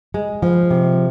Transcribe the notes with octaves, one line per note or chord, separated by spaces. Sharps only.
G#3
F3
C3